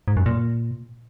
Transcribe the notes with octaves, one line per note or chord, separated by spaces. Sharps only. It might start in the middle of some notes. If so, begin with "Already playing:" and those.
G#2
F#2
A#2